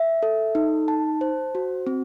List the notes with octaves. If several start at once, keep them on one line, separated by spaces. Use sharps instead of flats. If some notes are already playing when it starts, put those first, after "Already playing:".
Already playing: E5
A4
D#4
A5
C5
F#4
C4